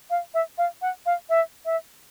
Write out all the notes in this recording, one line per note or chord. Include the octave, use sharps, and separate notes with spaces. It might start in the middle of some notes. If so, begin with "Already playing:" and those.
F5
E5
F5
F#5
F5
E5
E5